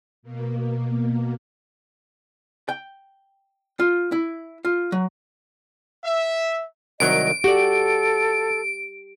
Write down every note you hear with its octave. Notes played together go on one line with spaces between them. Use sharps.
B2 A#3
G5
F4
E4
F4
F#3
E5
C2 D#3 F#3 D#5 D7
F#4 G4 A4 D5